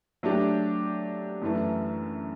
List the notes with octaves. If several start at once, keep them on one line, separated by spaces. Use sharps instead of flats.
F#3 A3 D4 G4
F#2 E3 A3